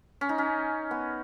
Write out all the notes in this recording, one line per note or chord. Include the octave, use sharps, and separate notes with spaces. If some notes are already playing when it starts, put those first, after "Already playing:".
C#4
D#4
C#4
B3